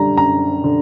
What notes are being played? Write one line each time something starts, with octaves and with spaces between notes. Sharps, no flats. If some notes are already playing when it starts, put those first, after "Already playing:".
Already playing: F#2 D3 G3 A#5
F#2 A#5
D3